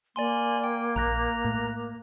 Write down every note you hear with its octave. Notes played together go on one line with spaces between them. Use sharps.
A#3 D5 G#5 C6
G5
A#1 A#2 A#5 F#6 A#6
A2